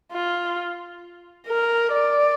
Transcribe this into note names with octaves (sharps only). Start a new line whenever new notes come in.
F4
A#4
D5